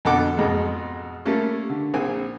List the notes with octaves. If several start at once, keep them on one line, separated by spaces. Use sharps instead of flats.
F2 B2 D3 A4 F#5 D6
F2 G#2 B2 G#3
G3 A3 A#3 C#4
D3
A#1 C4 G#5